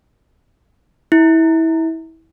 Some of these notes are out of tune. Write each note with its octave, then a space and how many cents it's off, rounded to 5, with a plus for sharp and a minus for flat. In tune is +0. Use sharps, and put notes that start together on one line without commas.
E4 -25